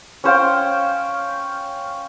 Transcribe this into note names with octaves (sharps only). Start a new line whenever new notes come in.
C#4 C5 F5 G5